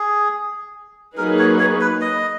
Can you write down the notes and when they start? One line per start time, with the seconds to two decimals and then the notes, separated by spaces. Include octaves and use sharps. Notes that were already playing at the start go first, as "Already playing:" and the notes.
Already playing: G#4
1.17 F#3 A#3 D#4 G#4 A#4 B4
1.39 C#5
1.59 C#5
1.81 B4
2.01 D#5